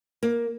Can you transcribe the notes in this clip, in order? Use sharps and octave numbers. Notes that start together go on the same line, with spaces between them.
A#3